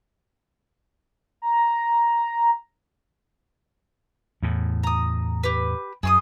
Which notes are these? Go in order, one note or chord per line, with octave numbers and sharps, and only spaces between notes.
A#5
E2 A2
A#5 D#6
G4 B4
F#2 G#4 C6 D#6